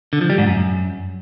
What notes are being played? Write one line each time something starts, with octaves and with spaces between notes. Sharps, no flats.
D3
F3
G3
G#2
F#2